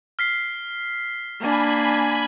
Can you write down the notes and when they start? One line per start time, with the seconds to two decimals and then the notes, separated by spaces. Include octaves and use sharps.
0.19 F6 B6 C7
1.40 A#3 D4 G#5 B5